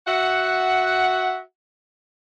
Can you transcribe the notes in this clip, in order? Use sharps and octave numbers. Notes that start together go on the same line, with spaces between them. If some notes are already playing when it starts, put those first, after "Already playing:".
F#4 E5 F#5